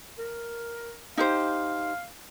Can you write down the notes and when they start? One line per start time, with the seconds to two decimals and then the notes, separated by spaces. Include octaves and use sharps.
0.19 A#4
1.17 D#4 G4 C5 F5